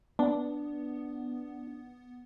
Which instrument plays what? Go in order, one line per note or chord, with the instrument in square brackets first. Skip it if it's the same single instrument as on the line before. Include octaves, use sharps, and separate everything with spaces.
[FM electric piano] B3 [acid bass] D4